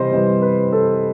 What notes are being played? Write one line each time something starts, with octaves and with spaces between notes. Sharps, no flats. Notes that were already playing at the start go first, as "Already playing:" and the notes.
Already playing: C3 E3 G3 C5 D#5
C3 E3 G3 D#5
B4
A4